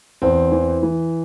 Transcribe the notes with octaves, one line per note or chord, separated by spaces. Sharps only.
E2 C4
E3
E3